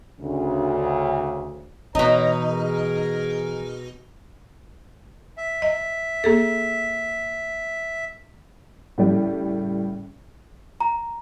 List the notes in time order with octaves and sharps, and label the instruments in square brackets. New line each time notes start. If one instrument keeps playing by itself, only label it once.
[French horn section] D2 C#3
[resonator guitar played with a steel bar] B2 D#4 [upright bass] E3 [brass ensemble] C#5 A#5
[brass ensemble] G#4 A#4
[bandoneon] E5
[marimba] D#5
A#3 G#4 A4
[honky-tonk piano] A2 C#3 G3
[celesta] A#5